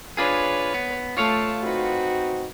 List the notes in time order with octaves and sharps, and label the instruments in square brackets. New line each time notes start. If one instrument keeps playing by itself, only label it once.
[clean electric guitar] D4 F4 G#4 [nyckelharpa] B4 C#5
[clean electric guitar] B3
[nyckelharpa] A3 A5 [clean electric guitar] F4 C#5 F5
[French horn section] C4 D#4 F#4 [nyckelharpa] B4